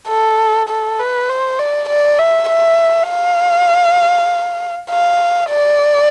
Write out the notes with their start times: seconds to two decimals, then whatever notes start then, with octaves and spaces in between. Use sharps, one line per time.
0.08 A4
0.69 A4
0.99 B4
1.29 C5
1.59 D5
1.89 D5
2.18 E5
2.49 E5
3.09 F5
4.90 F5
5.50 D5